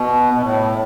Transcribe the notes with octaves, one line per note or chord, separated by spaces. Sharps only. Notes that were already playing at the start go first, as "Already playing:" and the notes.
Already playing: B2
B2
A2